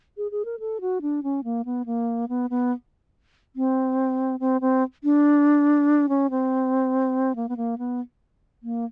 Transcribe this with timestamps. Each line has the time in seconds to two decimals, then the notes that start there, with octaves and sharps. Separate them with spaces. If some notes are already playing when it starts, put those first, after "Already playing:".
0.17 G#4
0.31 G#4
0.45 A#4
0.60 A4
0.81 F#4
1.02 D4
1.23 C#4
1.44 A#3
1.65 B3
1.86 A#3
2.29 B3
2.50 B3
3.56 C4
4.40 C4
4.61 C4
5.04 D4
6.09 C#4
6.30 C4
7.36 A#3
7.49 B3
7.57 A#3
7.78 B3
8.63 A#3